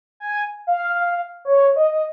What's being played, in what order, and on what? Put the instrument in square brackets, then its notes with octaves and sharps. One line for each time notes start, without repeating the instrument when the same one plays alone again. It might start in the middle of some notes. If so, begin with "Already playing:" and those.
[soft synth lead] G#5
F5
C#5
D#5
D#5